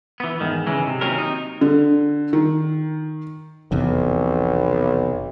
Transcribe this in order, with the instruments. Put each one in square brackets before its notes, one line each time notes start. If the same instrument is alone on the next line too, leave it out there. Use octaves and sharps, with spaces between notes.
[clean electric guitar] E3 B3
E2 G#2 D#3
C#3 E3 G#3
C3
D#2 C3 F#3 C4 C#4 A#4
D#4
[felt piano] D3
D#3
[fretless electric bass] F1 E2 C3 [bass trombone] B1